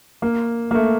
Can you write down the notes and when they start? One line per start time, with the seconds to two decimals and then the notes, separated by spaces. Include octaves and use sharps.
0.22 A#3
0.71 A#3
0.75 A3